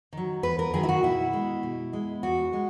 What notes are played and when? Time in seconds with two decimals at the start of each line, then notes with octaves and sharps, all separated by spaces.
0.13 D#3 F#3
0.43 E2 B4
0.59 A#4
0.74 D#3 F#3 G#4
0.83 E4
0.89 F#4
1.03 B2 E4
1.33 G#3
1.63 B2
1.93 G#3
2.23 E2 F#4
2.53 G#3